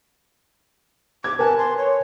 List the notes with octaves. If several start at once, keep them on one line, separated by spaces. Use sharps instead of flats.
D6 G#6
A#4 B4 G#5 A5
C6
C#5